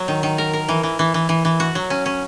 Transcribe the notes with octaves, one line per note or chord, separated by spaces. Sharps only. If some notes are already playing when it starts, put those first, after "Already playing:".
Already playing: F#3
D#3
D#3
A#4
A#4
E3
E3
E3
E3
E3
E3
F#4
F#3
C#4
C#4